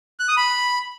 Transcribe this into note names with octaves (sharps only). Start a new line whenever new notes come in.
F#6
D#6
B5